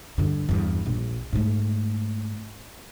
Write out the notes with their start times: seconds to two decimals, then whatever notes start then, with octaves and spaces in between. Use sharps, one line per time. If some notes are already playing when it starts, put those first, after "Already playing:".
0.18 G2 D3
0.49 E2 G2
0.86 A#1
1.33 G#2 A3